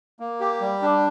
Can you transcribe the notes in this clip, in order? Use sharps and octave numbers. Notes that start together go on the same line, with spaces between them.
A#3
G4
G3
D4